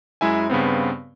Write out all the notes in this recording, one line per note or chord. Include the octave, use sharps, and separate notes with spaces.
F#2 G#3 E4 E5 G#5
G2 C#3 B3 C4